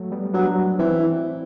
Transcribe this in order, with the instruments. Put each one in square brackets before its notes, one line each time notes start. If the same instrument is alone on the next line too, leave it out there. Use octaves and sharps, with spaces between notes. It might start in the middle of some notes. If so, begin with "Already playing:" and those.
Already playing: [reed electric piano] F#3 A3
G3 B3
[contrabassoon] F#3 [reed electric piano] B3 D4
[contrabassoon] E3 [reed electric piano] C4 E4